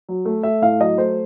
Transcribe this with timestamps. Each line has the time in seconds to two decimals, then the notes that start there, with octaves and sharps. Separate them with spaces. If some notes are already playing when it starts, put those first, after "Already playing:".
0.09 F#3
0.25 A3
0.43 A3 E5
0.62 A2 F5
0.80 F#3 D#5
0.98 A3 C5